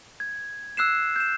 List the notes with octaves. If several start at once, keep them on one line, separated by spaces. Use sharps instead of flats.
G#6
E6 F#6 C7 E7
G6 E7